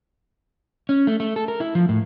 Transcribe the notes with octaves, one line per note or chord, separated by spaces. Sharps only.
C#4
A3
A3
A4
A#4
E4
F3
A2